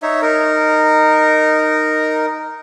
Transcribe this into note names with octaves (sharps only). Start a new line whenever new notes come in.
D#4 C#5 E5
D#4 A#4